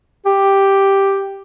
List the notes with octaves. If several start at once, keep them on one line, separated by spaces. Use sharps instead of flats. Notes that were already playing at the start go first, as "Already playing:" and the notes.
G4